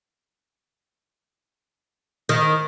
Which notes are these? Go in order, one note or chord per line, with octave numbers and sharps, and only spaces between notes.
D#3